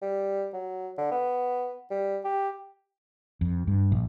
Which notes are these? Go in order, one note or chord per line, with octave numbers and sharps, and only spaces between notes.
G3
F#3
D3
B3
G3
G4
F2
G2
A#1